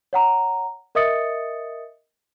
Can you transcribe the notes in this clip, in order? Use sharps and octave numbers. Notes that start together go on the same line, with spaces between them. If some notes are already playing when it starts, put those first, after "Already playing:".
C#5 F#5 A#5
A#4 D#5 E5 D#6 A6 C#7